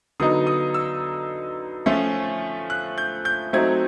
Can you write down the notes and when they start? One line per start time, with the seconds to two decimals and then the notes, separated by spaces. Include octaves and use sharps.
0.20 D3 F#3 B3 D#4 D#6
0.47 D#6
0.74 E6
1.86 F3 A3 C#4 F4
2.70 F#6
2.98 G6
3.25 G6
3.53 F#3 A3 C4 D#4 G#6